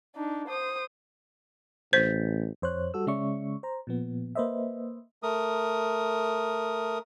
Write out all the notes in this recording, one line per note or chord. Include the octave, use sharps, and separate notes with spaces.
D4 D#4
C5 D#6
A1 C5 G6 A6 B6
F2 C5 C#5 F#6
G3 F#4 A4 E6
C#3 G#3 C#4 D5 E5 C#6
C5 A#5
A#2 F3 B3
A#3 B4 C5 D#5 E5
A3 A#4 D#6